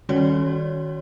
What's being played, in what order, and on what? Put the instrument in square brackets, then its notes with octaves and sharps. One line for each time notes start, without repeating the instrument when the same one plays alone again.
[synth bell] D#3 G3 C#4 F#4 C#5 D5